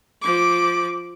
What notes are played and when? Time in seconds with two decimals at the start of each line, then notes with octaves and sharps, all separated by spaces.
0.21 F3 D6